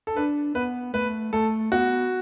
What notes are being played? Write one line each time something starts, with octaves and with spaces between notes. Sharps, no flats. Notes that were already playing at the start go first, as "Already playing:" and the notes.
A4
D4 B4
B3 B4
A3 B4
A3 A4
B3 F#4